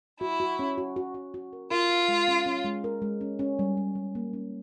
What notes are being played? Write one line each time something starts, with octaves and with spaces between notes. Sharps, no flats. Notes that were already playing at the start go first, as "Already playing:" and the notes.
E4 F#4
F#4
C#4
F#4
F#4
F#4
F#4
A#4
F4 A#4
A#4
G#3
C#4
C#4
G#3
A#4
G#3
C#4
C#4
G3
G3
G3
A#3
C#4